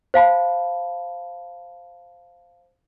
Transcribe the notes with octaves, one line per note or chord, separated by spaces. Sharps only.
C5 F5 A5 B5